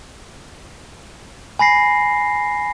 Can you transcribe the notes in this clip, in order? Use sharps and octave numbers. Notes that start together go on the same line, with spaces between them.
G#5 B5 A#6 C7